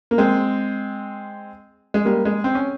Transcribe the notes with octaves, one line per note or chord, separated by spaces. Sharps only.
A#3
G#3 C4
G#3
G3 A#3
G#3
C4
C#4